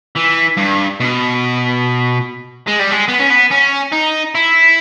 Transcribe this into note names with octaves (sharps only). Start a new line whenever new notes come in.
E3
G2
B2
G#3
G3
G#3
B3
C#4
B3
C#4
D#4
E4